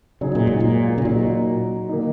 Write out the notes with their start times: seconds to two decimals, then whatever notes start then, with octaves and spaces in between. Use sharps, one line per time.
0.21 C#3 F#3 D#4 G#4
0.35 A#2
0.47 G#2
0.60 A#2
0.98 C#3
1.05 A#2 F#3 D#4 F#4
1.89 D#3 A#3 D#4